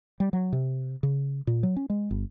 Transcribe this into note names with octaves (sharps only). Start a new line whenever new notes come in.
G3
F#3
C3
C#3
A#2
F#3
C#4
G#3
G1